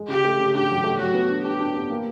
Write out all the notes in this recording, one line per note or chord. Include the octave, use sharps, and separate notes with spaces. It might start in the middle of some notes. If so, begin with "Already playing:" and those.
Already playing: G#3
C#3 G4
A3
C#3
D4 G4
F#3
A3
F#3 F#4
B3
D4
D4 G4
D4
B3
A#3